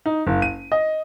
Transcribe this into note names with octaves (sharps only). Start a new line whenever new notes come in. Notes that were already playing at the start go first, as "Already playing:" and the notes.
D#4
F#1
D#7
D#5